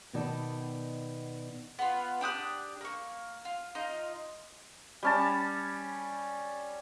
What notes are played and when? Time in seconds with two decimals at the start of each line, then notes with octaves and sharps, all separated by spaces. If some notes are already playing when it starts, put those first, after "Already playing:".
0.13 B2 D#3 B3 D#4 D5 A5
1.79 B3 F4
2.21 D4 G4 D#6 F#6
2.81 A#3 C#6
3.45 F4
3.75 D#4 F4 D#5
5.03 G3 C#4 A5